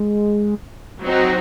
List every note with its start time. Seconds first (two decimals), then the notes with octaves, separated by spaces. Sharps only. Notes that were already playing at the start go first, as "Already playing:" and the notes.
Already playing: G#3
1.01 F#3 C4 D#4 F#4